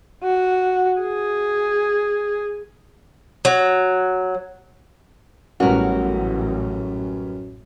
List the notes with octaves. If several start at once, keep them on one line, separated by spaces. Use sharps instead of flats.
F#4
G#4
F#3
A1 F#2 G3 B3 C#4 F#4 A#4